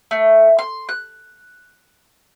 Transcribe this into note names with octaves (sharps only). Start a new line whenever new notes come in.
A3
C6
F#6